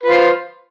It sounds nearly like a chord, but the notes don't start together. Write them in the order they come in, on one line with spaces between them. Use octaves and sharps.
B4 F4 C5